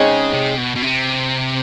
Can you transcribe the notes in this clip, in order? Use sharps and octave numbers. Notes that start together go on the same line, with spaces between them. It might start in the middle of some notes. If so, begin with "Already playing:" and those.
Already playing: C#3 G#3 C4 D#4 G#4 C#5
C3
B2
B2
C3